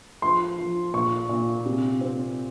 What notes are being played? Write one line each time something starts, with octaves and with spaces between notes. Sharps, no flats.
F3 C6
F3
A#2 C#6
A#2
C3
C4